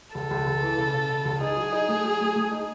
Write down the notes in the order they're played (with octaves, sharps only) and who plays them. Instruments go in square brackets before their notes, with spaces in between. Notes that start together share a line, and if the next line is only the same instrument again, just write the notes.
[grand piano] C#2 [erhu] A4
[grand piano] C#2
C#2
E3
C#3
C#3
C#3
C#2
[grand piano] D#4 [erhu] G#4
[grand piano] F#3
D#4
A3
F#3
A3
A3
D#4